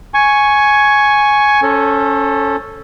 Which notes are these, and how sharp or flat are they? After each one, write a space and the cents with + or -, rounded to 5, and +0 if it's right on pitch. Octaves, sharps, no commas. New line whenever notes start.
G#5 +10 C#6 +0
C#4 +5 A4 +0 C5 +40